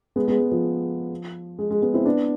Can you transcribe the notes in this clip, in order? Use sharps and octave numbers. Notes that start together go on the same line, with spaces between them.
G#3 B3
G#3 B3
G#3
F3
G#3
G#3
G#3 B3
C4 E4
B3 D4